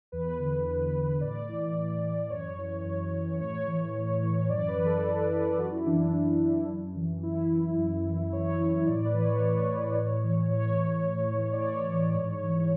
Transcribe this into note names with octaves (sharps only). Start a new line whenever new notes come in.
E2 B4
D3
E2
D3
A2 D5
E3
A2
E3
F#2 C#5
E3
F#2
E3
A2 C#5
E3
A2
E3
F#2 D5
B4
E3
A4
F#2
E3
F#2 F#4
E4
E3 D4
F#2
E3
F#2
E3
F#2 E4
E3
F#2
E3
F#2 C#5
E3
A2 D5
B4
E3
C#5
A2 C#5
E3
A2
E3
A2 C#5
E3
A2
E3
D5
A2 C#5
E3
G#2
E3